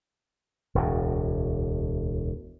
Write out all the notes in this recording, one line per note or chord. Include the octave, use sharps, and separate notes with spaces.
E1 D2 A2